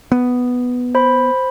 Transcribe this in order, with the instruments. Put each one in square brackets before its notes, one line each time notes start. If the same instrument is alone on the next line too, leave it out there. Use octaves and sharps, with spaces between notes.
[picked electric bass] B3
[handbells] C5 B5